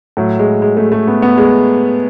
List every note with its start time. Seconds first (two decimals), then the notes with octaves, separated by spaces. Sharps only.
0.17 A2 F#3
0.39 G#3
0.62 G#3
0.77 A3
0.92 A3
1.07 B3
1.22 B3
1.38 G#3